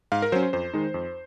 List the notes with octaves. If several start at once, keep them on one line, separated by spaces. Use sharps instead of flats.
G#2 F5
A#4
F#3 C#4 C5
C5
F2 C5
D#3 G#3 D#4
F2